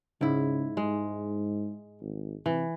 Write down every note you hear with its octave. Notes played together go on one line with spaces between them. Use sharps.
G#2 C#3 E4
G#2 G#3
G#1
C3 E3